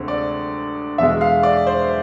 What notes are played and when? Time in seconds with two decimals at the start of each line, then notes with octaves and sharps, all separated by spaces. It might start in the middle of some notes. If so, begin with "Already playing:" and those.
Already playing: D2 C3 G#3 C4
0.08 D5
0.98 E2 B2 G#3 E5
1.21 F5
1.43 D5
1.67 C5